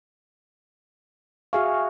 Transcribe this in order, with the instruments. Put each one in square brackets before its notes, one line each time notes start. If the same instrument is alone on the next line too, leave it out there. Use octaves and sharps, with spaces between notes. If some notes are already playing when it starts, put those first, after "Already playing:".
[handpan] F#4 G#4 F5 [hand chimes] E5 G#5 C#6